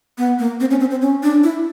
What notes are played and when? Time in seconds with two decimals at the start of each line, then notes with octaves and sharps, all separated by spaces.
0.18 B3
0.39 A#3
0.60 C4
0.71 C#4
0.80 C4
0.91 C4
1.02 C#4
1.23 D4
1.43 E4